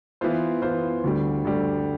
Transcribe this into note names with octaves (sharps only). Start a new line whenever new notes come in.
E3 B3 F4 C5
E3 B3 F4 C5
D2 D3 G3
D2 D3 G3